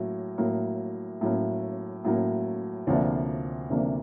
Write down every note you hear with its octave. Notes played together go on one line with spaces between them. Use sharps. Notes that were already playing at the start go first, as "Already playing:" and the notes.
Already playing: A2 F#3 A#3
A2 F#3 A#3
A2 F#3 A#3
A2 F#3 A#3
D2 C3 F3 A#3 D4
D2 C3 F3 A#3 D4